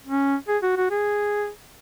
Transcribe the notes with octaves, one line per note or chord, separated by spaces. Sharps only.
C#4
G#4
F#4
F#4
G#4